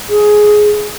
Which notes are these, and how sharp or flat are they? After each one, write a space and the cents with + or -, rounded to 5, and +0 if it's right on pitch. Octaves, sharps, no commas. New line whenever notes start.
G#4 +10